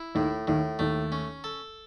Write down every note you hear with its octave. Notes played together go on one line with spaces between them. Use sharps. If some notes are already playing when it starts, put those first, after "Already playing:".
Already playing: E4
D#2 A2 D#3
D#2 A2 D#3
D#2 D#3 A3
C#4
A4